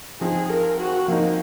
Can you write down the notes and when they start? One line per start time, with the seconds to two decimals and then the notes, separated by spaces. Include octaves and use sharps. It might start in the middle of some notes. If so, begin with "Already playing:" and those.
0.21 F3 C4 D#4 G#4
0.50 A#4
0.80 F#4
1.08 F3 A#3 C4 D#4